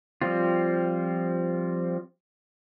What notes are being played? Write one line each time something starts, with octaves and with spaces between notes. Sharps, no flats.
F3 G3 C4 F4